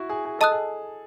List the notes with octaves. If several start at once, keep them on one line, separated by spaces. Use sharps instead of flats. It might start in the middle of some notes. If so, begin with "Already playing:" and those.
Already playing: E4 F#4
G#4
G#4
A4 D#5 A5 D#6 F#6
G#4